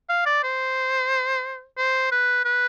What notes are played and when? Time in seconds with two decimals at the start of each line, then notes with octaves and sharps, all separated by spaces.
0.09 F5
0.26 D5
0.43 C5
1.77 C5
2.12 B4
2.45 B4